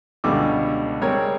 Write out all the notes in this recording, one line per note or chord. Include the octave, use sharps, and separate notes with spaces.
C#2 B2 D3 G3 D6
G3 G#3 C4 G#4 A#4 C#5